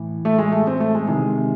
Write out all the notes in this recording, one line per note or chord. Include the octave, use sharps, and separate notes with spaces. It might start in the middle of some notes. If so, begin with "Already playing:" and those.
Already playing: A2 E3
A3
G#3
A3
C4
A3
G#3
C3 D#3 G#3